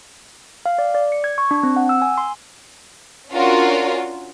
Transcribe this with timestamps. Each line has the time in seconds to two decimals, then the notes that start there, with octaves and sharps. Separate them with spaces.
0.66 F5
0.78 D5
0.95 D5
1.12 C#7
1.24 G#6
1.38 C#6
1.51 D4
1.63 C4
1.76 F#5
1.89 E6
2.02 G#5
2.18 C6
3.32 C#4 D4 F4 F#4 A#4 D5